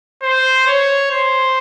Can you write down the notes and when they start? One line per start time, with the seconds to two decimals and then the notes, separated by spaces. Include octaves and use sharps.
0.22 C5
0.67 C#5
1.11 C5